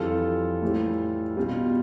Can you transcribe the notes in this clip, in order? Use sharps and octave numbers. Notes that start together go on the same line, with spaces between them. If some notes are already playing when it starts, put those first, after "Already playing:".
Already playing: F2 E3 G3 F4 A4
A2 E3 G3
B2 G3 F4